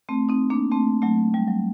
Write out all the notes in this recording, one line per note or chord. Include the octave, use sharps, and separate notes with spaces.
A3 C4
C4 D#4
A#3 D4
A3 C4
F#3 A3
G3
F#3